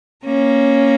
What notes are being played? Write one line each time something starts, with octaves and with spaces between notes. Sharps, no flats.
A#3 C#4